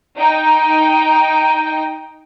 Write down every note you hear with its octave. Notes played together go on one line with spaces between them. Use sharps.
D#4 G5